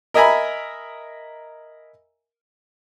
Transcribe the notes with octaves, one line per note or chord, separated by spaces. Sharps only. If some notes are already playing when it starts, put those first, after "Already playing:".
A#4 D#5 E5 G#5 A#5 B5